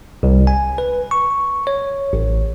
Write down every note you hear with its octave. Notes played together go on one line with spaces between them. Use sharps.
C2
G#5
B4
C#6
C#5
A1